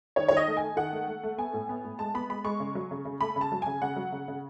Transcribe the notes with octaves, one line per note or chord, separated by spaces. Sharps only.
D#3 C#5
D#3 C#5
D#5
A3
G#5
A3
D#3 F#5
A3
A3
A3
B3 G#5
A2
B3
A2
G#3 A5
B3 B5
G#3 B5
G#3 C#6
C#3
F#3
C#3
C#3
A3 B5
C#3
A5
F#3
C#3 G#5
C#3 F#5
F#3
C#3
C#3